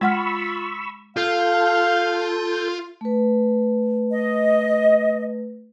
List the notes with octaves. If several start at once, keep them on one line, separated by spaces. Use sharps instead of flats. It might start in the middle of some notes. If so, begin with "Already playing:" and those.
G#3 F4 F#5 B5 C#6 E6 F6
F4 A4 F5 G6
A3 B4
D#5